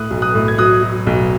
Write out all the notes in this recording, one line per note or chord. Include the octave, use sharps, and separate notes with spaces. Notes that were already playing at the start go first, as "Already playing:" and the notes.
Already playing: A2 D#6 F#6
B1
D#6 F#6
A2
G#6
F#3 D#6 F#6
F#3
B1